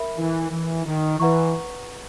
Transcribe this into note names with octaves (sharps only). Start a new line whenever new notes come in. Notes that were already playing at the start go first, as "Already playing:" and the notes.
Already playing: A#4 E5 B5
E3
E3
D#3
E3 B4 F#5 A#5 C#6